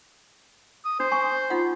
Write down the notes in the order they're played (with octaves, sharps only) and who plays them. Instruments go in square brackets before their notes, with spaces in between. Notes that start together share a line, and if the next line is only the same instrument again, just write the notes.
[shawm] D#6
[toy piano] D4 [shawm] C5
[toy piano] G#5 C#6
D#4 F4 F#5